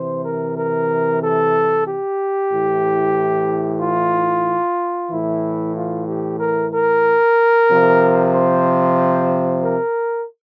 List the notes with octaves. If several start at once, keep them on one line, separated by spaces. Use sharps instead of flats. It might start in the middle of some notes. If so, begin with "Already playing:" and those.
Already playing: C3 E3 C5
A#4
A#4
A4
G4
A2 E3
F4
A2 E3 E4
F4
G4
A#4
A#4
C3 F3
C5
A#4